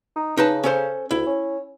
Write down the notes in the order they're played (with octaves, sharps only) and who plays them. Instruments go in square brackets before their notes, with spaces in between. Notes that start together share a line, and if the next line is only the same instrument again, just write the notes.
[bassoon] D#4
[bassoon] C#3 [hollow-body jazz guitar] D#4 B4 A5
[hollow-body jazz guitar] C#4 A4 C5
[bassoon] D2 [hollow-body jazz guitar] E4
[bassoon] C#4